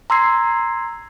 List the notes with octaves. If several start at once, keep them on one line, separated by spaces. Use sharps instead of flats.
A#5 C6 E6 G#6 C7